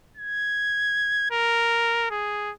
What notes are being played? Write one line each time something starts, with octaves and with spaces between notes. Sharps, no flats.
G#6
A#4
G#4